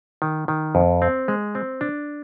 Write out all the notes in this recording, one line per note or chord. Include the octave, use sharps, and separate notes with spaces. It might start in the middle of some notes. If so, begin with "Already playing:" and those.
D#3
D#3
F2
C4
G#3
C4
D4